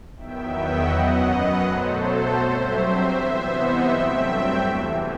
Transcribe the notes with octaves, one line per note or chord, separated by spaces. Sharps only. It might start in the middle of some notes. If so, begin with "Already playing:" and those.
E2 D#3 F#3 B3 E5 G5
D#5 F#5
F#2 F#3 B3
B4 D#5
B2 F#3 A3 A4 C5
G2 F#3 C4 C5 E5
C3 E3 B3 C5 E5
D#5 F#5
G2 F#3 A3 C4 E5 G5
E2 C3 E3